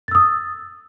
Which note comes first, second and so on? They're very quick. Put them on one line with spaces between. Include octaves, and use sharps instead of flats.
A6 E6 D#6